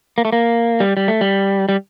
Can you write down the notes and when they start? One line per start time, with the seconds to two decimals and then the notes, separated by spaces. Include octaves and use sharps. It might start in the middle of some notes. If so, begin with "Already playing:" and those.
0.18 A#3
0.25 A3
0.32 A#3
0.80 G3
0.97 G3
1.08 A3
1.21 G3
1.69 G3